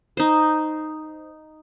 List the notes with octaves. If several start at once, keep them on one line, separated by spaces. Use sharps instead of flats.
D#4 C5